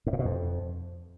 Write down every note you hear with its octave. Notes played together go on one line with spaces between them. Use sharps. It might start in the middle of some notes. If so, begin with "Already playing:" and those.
G#2
A#2
B2
F2